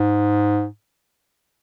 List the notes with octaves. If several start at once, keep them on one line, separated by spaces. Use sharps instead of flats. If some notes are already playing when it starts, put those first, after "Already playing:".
Already playing: G#2